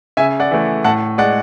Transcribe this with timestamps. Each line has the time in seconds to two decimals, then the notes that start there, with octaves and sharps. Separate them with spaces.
0.17 C#3 E5 G#5
0.40 D5 F#5
0.51 E3 A3
0.84 A2 F#5 A5
1.18 G#3 D5 F#5